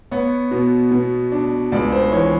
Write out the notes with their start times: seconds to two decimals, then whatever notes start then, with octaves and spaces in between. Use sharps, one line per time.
0.11 B3 C#5
0.51 B2
0.91 B2
1.32 D4
1.72 C#2 D5
1.92 C5
2.12 E3 C#5